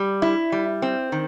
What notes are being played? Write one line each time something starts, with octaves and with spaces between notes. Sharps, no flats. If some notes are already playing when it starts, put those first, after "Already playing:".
Already playing: G3
E4
G3
C4
D#3